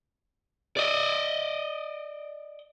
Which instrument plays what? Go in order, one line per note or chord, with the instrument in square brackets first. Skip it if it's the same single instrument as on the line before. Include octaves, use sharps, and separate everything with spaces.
[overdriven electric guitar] D5 D#5